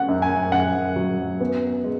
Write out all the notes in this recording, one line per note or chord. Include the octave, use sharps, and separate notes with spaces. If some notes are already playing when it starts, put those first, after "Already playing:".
Already playing: C#4 F#5
F#2
G#5
F#2 F#5
F#3
B3
G#3